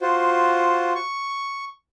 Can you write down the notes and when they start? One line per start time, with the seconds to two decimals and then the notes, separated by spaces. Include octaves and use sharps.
0.01 F4 F#4 C5
0.95 C#6